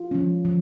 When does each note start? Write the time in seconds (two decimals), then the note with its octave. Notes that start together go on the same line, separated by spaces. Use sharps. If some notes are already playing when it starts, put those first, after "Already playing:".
Already playing: F4
0.11 F3 G#3 C#4
0.45 F3